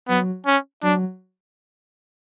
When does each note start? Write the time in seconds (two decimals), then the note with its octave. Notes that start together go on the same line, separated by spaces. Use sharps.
0.08 F#3 B3
0.46 C#4
0.82 F#3 D4